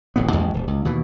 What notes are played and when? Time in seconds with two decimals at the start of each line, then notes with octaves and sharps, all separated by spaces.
0.16 D1 A1 A2 B3
0.31 A1 E2 G#2 G#3
0.54 D#1
0.67 C#2
0.85 D#2 B2 E3